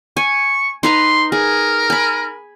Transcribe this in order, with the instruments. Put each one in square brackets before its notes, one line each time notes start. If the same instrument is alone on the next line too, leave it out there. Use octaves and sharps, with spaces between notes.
[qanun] G#5 [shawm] C#6
[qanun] D#4 B4 A#5 [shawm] C6
[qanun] G#4 [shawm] A#4
[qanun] G#5 B5